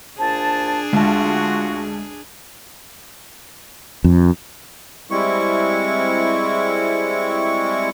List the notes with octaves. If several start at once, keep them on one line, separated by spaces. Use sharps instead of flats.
A#2 D4 G#4 C5 A5
D2 G#3 F4 F#4 A5
F2
G3 G#3 C4 E4 C#6